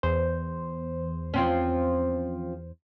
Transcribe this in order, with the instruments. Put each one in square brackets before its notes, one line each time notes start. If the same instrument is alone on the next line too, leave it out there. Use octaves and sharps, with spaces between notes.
[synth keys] E2 C5
[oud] F3 C4 C#4